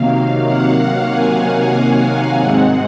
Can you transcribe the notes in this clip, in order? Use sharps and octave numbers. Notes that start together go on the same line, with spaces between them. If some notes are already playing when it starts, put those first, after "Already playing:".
Already playing: C3 D#3 F#3 A#3 F5
F#5
G#5
G#5
G#2 D#3 G#3 C4 F#5